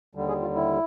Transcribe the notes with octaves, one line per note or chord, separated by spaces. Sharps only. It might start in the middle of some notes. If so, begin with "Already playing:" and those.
D#2 D3 G3
G#4
F4
E4